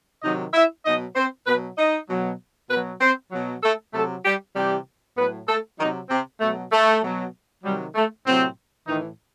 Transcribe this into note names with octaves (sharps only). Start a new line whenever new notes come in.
C3 D#3 F#3 D#4 D#5
E4 E5
B2 F#3 D#4 D#5
C4 C5
B2 F#3 B3 B4
D#4 D#5
B2 F#3
B2 B3 B4
F#3
C4 C5
B2 F#3
A3 A4
C3 F#3 A3 A4
G3 G4
C3 E3 G3 G4
A2 F#3 B3 B4
A3 A4
C3 D#3 F#3 D#4
C3 C4
B2 F#3 A3
A3
B2 F#3
C3 D#3 F#3 G3
A3
A2 C3 F#3 C4
A2 D#3 E3 D#4